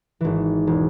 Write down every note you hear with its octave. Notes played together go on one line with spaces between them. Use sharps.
G#1 E3
E1